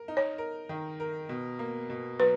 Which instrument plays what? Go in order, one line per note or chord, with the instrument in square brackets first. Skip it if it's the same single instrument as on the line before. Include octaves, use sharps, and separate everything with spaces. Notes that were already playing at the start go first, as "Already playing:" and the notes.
Already playing: [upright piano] A#4
D#4
[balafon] C#5
[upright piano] A#4
D#3
A#4
B2
A#3
B2
[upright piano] F#3 [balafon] B4